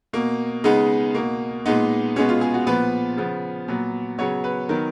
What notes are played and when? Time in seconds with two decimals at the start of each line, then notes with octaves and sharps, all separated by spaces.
0.13 B2 A#3
0.64 C#3 G#3 B3 D#4
1.14 B2 A#3
1.65 A#2 G#3 B3 D#4
2.16 B2 G#3 B3 C#4
2.29 F4
2.41 G#4
2.54 F#4
2.67 A#2 F3 B3 B4
3.17 C#3 F3 B3
3.68 A#2 F#3 B3
4.18 C#3 F#3 B3 C#5
4.44 B4
4.69 D#3 F#3 B3 A#4